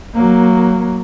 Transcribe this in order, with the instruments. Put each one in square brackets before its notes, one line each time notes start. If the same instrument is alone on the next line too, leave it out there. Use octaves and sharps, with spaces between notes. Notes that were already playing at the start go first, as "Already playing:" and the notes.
[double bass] F#3 A#3